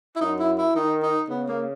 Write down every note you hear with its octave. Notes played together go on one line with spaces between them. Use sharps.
E4
F#2 D#4
E4
E4
D#3 D#4
D#4
C#3 B3
A#3